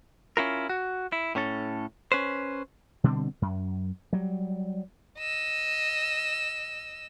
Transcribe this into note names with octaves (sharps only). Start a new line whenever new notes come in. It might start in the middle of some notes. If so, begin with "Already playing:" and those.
C#4 E4 F4 A#4
F#4
E4
A2 C#4 A4
C#4 B4 C5
B2 D3 G3 C4
F#2
F#3 G3
D#5 E6